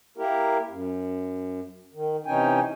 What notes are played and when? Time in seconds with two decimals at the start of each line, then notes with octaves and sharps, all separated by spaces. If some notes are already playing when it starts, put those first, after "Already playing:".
0.17 A#3 E4 G4 A#4
0.69 F#2
1.94 D#3
2.26 C3 E3 C#4 D#4 G5 G#5